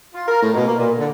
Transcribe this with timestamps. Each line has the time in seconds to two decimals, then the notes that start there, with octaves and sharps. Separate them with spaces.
0.14 F4
0.27 A#4
0.42 A2
0.54 B2
0.67 A#3
0.78 A#2
0.98 D3